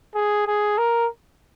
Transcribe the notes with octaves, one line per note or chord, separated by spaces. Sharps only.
G#4
G#4
A#4